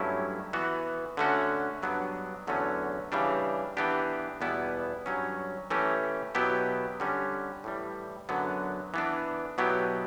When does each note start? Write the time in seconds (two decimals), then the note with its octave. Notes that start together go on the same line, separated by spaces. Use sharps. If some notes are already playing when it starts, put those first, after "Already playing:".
Already playing: G2 F#3 A3 C#4 E4
0.53 E3 B3 F#4
1.17 D3 A3 C#4 F#4
1.82 G2 F#3 B3 D4
2.47 E2 D3 F#3 A3 C#4
3.12 C#3 E3 G3 D4
3.77 E3 B3 D4 G4
4.41 E2 B2 G3 B3 E4
5.06 G2 F#3 C#4
5.70 E3 A3 C#4 G4
6.35 B2 F#3 B3 E4 G4
7.00 D3 G3 C#4
7.64 A2 E3 G3
8.29 F#2 D3 F#3 B3
8.94 E3 B3 D4
9.58 B2 F#3 B3 E4 G4